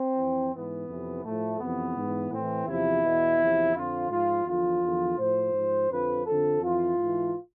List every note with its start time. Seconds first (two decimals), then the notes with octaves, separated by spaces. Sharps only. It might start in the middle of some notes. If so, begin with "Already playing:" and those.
Already playing: C4
0.17 F2 E3
0.52 G#2 E3 B3
0.89 F2 C3 E3
1.24 A2 F3 A3
1.60 F2 C3 E3 B3
1.96 G#2 E3
2.32 A2 E3 C4
2.67 E2 C3 F3 E4
3.04 E2 B2
3.39 E2 C3 F3
3.74 F2 D3 F3 F4
4.10 G#2 F3 F4
4.46 E2 D3 F3 F4
4.82 E2 D3 F3
5.17 A2 F3 C5
5.54 G#2 F3
5.90 F2 D3 F3 B4
6.25 F2 D3 F3 A4
6.61 F2 E3 F4
6.98 G#2 E3